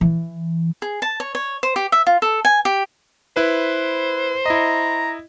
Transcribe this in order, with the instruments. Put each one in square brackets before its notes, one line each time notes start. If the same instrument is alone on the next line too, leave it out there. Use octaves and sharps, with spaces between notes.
[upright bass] E3
[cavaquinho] G#4
A5
C#5
C#5
C5
G4
E5
F4
A4
G#5
G4
[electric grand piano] E4 B4 [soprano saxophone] C5
[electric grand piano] E4 D#5 [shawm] A#5